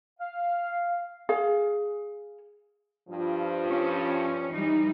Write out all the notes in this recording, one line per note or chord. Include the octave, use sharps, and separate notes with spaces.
F5
G#4 F5
G2 F3
C#4
E3 G3 D#4